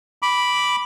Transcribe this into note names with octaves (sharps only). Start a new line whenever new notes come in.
B5 D6